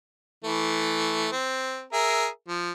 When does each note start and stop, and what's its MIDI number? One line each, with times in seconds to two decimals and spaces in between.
0.44 1.30 52
0.44 1.30 57
1.32 1.84 60
1.93 2.27 68
1.93 2.27 70
1.93 2.27 76
2.48 2.72 53